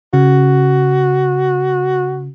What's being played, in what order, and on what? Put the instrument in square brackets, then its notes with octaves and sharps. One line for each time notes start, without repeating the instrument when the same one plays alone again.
[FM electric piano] C#3 [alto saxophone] F#4